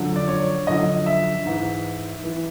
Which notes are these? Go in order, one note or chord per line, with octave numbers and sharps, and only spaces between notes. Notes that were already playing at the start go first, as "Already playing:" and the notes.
Already playing: F#2 D3 F3
D5
C#5
F#2 D3 F3 D#5
E5
G#2 E3
E3